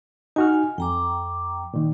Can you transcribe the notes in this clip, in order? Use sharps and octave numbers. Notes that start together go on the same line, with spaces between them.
D#4 F#4 G#5 F6
F2 G5 A#5 D6
A#2 D#3